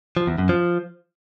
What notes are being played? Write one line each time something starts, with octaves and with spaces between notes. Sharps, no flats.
F3
E2
F#2
F3